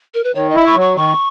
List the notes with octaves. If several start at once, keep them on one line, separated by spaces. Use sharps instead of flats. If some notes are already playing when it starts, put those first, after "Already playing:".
A#4
B4
D#3 C#5
D#5
E4
C#6
F#3
C#6
D#3 C#6